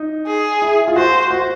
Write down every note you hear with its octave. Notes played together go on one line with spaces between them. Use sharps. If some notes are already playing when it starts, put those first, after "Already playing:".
Already playing: D#4
G#4
E4
F4
F#4 C5
F#4